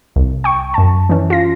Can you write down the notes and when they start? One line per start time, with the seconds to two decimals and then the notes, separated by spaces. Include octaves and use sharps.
0.16 C2
0.44 G5 C#6
0.74 F#2 A5
1.10 E3 C#4
1.30 F4 A#6